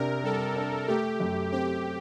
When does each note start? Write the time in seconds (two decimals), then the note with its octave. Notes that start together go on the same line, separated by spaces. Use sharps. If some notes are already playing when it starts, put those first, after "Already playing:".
Already playing: C3 D4 A#4
0.23 G3 A4
0.56 D4
0.88 A3 G4
1.20 F#2
1.52 C4 G4